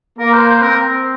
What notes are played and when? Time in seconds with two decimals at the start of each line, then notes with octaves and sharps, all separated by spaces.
0.18 A#3 A#4
0.34 C5
0.48 C5
0.62 C4 A#4